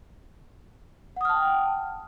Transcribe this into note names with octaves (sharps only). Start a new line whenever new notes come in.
F#5 G5 A5 D#6 F6